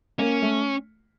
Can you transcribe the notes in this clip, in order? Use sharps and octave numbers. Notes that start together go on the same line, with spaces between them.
A#3 C#4
A3